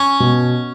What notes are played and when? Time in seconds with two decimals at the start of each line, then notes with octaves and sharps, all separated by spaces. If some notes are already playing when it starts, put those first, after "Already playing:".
Already playing: C#4
0.20 B2